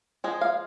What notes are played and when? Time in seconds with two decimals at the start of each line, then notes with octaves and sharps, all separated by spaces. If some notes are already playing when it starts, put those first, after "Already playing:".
0.24 F3 G#3
0.41 F5